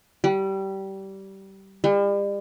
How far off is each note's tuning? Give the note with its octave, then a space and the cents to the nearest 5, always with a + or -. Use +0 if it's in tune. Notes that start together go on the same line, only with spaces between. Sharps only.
G3 -20
G3 +40